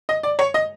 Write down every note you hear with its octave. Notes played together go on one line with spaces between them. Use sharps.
D#5
D5
C#5
D#5